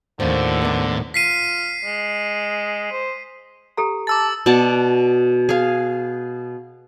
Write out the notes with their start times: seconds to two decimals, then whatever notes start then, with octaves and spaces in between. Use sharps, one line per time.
0.20 D#2 A2 D3 F3
0.61 E2 G2 C3
1.14 F4 B6 C7 D#7
1.85 G#3
2.92 C5
3.77 G4 A4 A#5
4.07 A5 D6 E6 A6
4.46 B2 D5 F#5 A5
5.49 G#4 F5